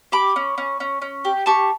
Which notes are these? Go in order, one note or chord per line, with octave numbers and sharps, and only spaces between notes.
G4 B5 D6
C#4
C#4
C#4
C#4
G4
G4 A5 C#6